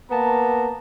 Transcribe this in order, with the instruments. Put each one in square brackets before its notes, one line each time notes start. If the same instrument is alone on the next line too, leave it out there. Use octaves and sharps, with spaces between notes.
[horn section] A#3 B3 A5 A#5